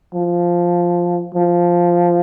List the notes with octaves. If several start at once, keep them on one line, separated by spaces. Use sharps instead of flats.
F3
F3